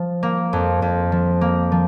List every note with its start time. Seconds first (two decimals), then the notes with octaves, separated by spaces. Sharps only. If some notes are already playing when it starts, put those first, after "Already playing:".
Already playing: F3
0.23 A#3
0.53 F2
0.82 F2
1.12 F3
1.41 A#3
1.72 F3